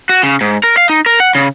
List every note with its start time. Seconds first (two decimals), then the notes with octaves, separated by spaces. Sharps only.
0.09 F#4
0.23 C#3
0.41 G#2
0.63 A#4
0.77 F5
0.89 D#4
1.06 A#4
1.20 F#5
1.35 C#3